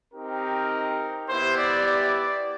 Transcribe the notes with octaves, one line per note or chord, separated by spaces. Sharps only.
C4 D#4 G4 A#4
B3 E4 G4 C5
D5
D5